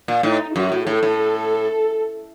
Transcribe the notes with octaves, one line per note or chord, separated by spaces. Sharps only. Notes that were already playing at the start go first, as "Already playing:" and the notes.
A#2
A2 D#4
F#2 F#4
A2
A2 A4
A2